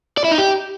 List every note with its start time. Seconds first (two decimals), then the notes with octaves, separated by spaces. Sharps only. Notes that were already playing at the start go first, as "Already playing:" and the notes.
0.18 D5
0.24 E4
0.31 D#4
0.38 G4